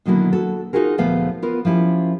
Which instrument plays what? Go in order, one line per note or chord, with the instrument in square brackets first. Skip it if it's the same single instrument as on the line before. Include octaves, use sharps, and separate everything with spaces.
[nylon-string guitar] B2 D3 D#3 F#3 A#3 E4
F#4 A4
D#4 F4 F#4 G#4 A#4
D2 A#2 F3 A3 B3 F5
B3 F4 A#4
F3 C#4 E4 G4